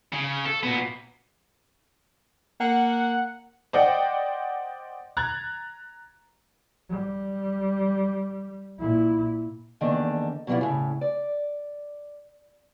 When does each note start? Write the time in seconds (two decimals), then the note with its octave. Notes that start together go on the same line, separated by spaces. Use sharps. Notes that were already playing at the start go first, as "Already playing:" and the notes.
0.12 C#3
0.46 A4
0.63 A#2 B3
2.60 A#3 F#5
3.73 C5 D5 D#5 F#5 G5
5.17 A#5 F#6 G#6 A6
6.90 G3
8.79 A#2 E4
9.81 E2 D3 D#3 A#3 D4
10.47 B2 F#3 G3 E4 F4
10.61 A2 C#3
11.01 D5